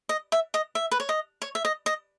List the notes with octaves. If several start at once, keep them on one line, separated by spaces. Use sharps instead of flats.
D#5
E5
D#5
E5
B4
C#5
D#5
C#5
E5
D#5
D#5